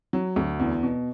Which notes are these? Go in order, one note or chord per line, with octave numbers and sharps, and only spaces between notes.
F#3
D2
E2
B2